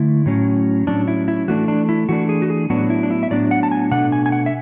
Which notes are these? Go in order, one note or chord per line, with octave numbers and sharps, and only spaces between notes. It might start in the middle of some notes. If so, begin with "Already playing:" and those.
Already playing: D3 A3 E4
A2 F#3 C#4
A2 F#3 C#4 D4
E4
E4
E3 A3 D4 F#4
D4
E4
E3 A3 D4 F#4
G#4
F#4
G#4
A2 F#3 B3 D4 F#4
E4
D4
E4
E5
A2 F#3 B3 D4 D5
F#5
A5
G#5
B2 A3 D4 F#5
G#5
G#5
F#5
E5